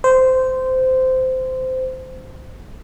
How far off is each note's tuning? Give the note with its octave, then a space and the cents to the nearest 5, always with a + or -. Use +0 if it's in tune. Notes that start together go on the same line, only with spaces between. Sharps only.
C5 -15